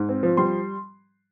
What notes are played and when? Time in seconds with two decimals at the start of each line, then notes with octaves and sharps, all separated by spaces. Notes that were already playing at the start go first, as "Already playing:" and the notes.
Already playing: G#2
0.09 C4
0.23 F3
0.37 G3 C6